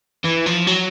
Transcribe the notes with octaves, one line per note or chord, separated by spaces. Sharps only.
E3
F3
F#3